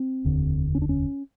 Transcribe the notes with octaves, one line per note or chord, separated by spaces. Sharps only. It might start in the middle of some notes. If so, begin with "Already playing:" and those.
Already playing: C4
F1 D#2 D3
C#4
D4
C#4